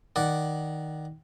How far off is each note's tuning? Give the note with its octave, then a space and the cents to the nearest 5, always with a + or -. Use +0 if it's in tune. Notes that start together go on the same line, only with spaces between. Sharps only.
D#3 +0 D5 +0 F#5 +0